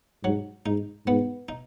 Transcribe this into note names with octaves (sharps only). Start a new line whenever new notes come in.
G#2 F#3
G#2 D#4
G#2 B3
D#4